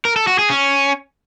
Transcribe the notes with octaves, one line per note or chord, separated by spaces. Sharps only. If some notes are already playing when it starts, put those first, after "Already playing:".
A#4
A4
F#4
G#4
C#4